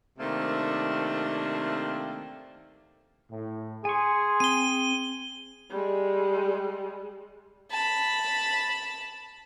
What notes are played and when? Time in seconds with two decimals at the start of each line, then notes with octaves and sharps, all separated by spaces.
0.18 C3 D#3 A3 A#3 C4 D4
3.31 A2
3.85 G#4 G#5 C6 C#6
4.40 C4 D#7 G7
5.70 G3 G#3
7.71 A5 B5